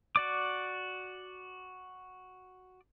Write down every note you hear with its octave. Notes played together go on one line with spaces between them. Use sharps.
F#4 D5 D6